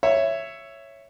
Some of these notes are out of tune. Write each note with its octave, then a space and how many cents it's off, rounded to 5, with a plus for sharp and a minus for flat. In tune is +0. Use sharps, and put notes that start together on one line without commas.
C#5 +0 E5 +10